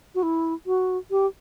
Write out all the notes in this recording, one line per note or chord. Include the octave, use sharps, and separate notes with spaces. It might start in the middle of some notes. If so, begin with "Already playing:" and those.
F#4
E4
F#4
G4